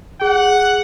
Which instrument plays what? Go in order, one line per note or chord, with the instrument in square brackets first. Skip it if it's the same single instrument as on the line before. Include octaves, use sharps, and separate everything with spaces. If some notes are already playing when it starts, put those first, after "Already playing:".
[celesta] G#4 [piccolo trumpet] F#5